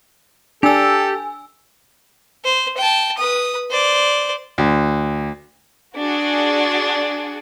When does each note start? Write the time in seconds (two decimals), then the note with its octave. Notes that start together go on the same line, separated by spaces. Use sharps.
0.63 D4 G4 A4 G#5 E6
2.44 C5
2.77 G5 A5
3.17 B4 D#6
3.71 C5 D5
4.58 D2
5.96 D4 F#4 G#4